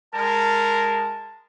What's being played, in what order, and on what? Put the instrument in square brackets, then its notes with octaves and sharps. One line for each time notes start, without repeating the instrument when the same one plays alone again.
[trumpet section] G#3 A#4 [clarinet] A5